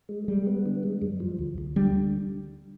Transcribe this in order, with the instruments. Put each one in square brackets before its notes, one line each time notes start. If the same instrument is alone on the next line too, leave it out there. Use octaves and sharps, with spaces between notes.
[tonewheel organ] G#3
[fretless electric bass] G3 [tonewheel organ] G#3
[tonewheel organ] B3
D3
G#3
F#2
F3
D2
D2
[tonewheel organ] D3 [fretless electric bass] G3